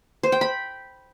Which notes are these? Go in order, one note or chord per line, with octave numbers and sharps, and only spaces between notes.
C5
G5
B5